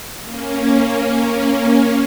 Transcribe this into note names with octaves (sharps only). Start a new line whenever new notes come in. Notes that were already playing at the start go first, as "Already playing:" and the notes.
A#3 C#4